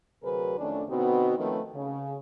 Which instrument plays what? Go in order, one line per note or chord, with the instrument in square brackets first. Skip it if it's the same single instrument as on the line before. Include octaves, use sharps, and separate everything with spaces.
[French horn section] D2 C3 F#3 G#4 A#4 B4
F2 D#3 A3 C#4 D4
B2 D3 B3 C4 D#4 F#4
D#3 F3 A3 C4 C#4 B4
C#3